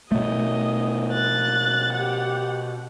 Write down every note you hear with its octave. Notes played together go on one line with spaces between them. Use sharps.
B2 A3 D#5
F#6 A6
G4 F#5